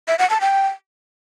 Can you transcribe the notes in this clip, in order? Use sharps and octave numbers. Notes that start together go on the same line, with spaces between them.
E5
F#5
A5
G5